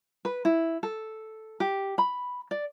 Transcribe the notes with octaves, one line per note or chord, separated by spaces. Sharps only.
B4
E4
A4
G4
B5
D5